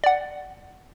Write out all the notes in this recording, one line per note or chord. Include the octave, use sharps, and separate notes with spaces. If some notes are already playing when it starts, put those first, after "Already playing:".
D5 F#5